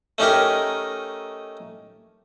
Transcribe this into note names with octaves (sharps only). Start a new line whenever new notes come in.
A3 C#4 D#4 G4 A#4